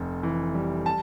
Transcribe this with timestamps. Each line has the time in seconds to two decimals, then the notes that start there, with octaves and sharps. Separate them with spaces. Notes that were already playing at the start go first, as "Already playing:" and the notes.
Already playing: F1 F2
0.23 E3
0.54 G3
0.86 A5